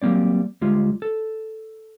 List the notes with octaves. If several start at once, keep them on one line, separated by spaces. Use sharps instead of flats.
F#3 G3 A#3 C4 D5
D2 G3 G#3 F4
A4